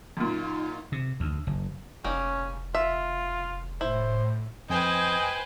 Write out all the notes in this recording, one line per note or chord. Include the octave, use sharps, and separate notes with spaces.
F#2 A#2 D#4 F4
C3
D2
F#1
F1 G3 A#3 C#4 D#4
F4 E5
A2 E4 C5
F2 B4 C5 D#5 G5 G#5